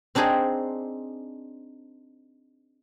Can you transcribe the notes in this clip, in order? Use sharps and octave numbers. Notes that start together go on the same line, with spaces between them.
C4 D4 D#4 G#4 C5